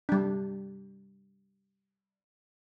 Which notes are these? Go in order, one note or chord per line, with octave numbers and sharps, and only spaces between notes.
G3 D4